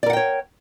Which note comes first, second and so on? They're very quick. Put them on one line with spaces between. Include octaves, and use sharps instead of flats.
D5 A#4 F#5 G5 C#5